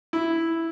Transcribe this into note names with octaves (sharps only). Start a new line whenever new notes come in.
E4